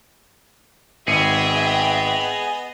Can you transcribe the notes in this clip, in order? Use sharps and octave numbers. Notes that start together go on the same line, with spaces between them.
G#1 B3 G#4 D#5 E5 G5 C#7 D#7